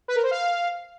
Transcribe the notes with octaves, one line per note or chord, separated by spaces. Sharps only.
B4
A#4
C5
F5